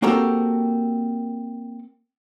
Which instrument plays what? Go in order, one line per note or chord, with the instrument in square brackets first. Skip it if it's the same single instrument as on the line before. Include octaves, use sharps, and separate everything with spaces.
[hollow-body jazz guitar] A#3 C4 F#4 G4 A4 A#4